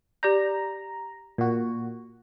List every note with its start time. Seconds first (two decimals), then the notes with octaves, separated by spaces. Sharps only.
0.23 G4 D5 A#5 G6
1.38 A#2 F#4